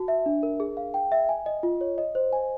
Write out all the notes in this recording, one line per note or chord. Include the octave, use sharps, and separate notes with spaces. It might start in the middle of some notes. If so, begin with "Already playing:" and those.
Already playing: F#4 A5
E5
D4
A#4
G#4
F5
G5
E5
G#5
D#5
F4
C#5
D#5
C5
G#5